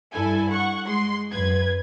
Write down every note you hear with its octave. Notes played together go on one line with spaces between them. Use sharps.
G2 E4 A4 G#5
F#5 C#6
G#3 C6
F#2 B4 G#6